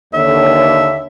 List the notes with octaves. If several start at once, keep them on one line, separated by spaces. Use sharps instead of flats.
D#2 D3 C#5 E5